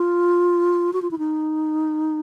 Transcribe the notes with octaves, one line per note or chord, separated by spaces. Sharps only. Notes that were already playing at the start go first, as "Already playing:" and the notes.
Already playing: F4
F#4
F4
E4
D#4